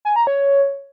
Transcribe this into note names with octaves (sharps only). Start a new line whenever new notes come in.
G#5
A#5
C#5